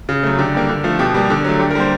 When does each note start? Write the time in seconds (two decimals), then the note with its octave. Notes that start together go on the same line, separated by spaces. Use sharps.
0.09 C#3
0.23 F#3 A3
0.38 D3 G4
0.54 G3 A#3
0.69 D3
0.84 F3 A3
0.99 B2 G4
1.14 G3 A#3
1.30 D3
1.45 F#3 A3
1.59 D3 G4
1.71 A#4
1.75 G3 A#3 C5